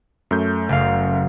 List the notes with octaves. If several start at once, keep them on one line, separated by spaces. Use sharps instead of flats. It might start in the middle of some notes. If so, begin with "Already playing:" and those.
F#2 A3 G6
F#1 F5